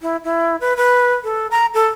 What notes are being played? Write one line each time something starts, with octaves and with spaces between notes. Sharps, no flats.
E4
E4
B4
B4
A4
A#5
A4